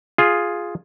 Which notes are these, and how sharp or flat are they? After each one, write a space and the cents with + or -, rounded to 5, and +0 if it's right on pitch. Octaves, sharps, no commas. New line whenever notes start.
F4 +5 G#4 +0